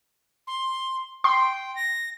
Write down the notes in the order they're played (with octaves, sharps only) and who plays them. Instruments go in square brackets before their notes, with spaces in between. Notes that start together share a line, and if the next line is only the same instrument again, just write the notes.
[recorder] C6
[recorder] G5 [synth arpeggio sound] C6
[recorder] A#6